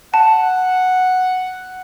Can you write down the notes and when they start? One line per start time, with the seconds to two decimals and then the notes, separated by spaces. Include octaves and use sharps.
0.14 F#5 A5